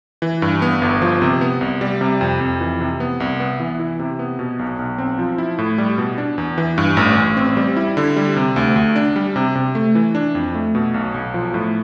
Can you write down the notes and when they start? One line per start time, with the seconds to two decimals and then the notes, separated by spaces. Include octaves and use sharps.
0.22 E3
0.42 G2
0.62 B3
0.82 G1
1.02 F3
1.22 C3
1.41 B3
1.61 C2
1.81 G3
2.01 C3
2.21 F2
2.41 F2
2.61 E3
2.80 C3
3.00 B3
3.20 C2
3.40 B3
3.60 E3
3.80 E4
3.99 C3
4.19 B3
4.39 B2
4.59 B1
4.79 B1
4.98 C4
5.19 F3
5.38 E4
5.58 A2
5.78 G3
5.98 B2
6.18 D4
6.38 E2
6.58 E3
6.78 G2
6.97 A1
7.17 A1
7.37 C4
7.57 G3
7.77 E4
7.97 D3
8.16 G3
8.36 C3
8.56 D2
8.76 D2
8.96 D4
9.16 G3
9.36 C3
9.55 C3
9.75 A3
9.95 E3
10.15 D4
10.35 F2
10.55 A3
10.75 B2
10.94 B1
11.14 B1
11.34 F3
11.54 A2